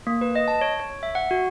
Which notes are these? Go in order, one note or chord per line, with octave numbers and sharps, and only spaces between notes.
A#3
B4
D#5
A5
C#5
C#5
E5
F#5
F#4